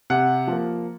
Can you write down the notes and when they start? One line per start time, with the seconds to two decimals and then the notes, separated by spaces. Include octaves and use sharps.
0.10 C3 F#5
0.47 F3 A#3